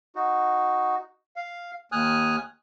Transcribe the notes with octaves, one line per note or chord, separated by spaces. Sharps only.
D#4 F#4
F5
D#2 G#5 D#6 F6 F#6